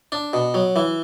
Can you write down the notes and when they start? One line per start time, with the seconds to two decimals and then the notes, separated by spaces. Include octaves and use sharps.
0.12 D4
0.33 B2
0.54 F#3
0.76 E3